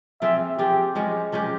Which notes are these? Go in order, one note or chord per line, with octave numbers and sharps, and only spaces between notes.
F3 C4 F4 G#4 E5
F3 C4 F4 G4 G#4
F3 G#3 C#4 G4
F3 G#3 C#4 G4